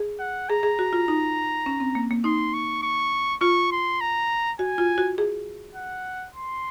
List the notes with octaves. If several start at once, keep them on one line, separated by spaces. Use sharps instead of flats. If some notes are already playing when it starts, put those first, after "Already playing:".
Already playing: G#4
F#5
G#4 A#5
G#4
F#4
F4
D#4
C#4
C4
A#3
A#3
D#4 C6
C#6
C#6
F4 C#6
C6
A#5
F#4 G#5
F4
F#4
G#4
F#5
C6